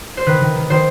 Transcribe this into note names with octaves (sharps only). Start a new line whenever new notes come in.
C5
D#3 B4
D#3
D#3
D#3 C5